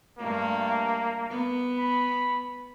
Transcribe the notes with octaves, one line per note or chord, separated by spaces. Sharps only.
G2 A3 A#3
B3
B5